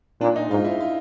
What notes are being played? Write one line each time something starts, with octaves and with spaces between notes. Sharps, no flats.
A#2 D4
D#4
G#2 F4
E4
F4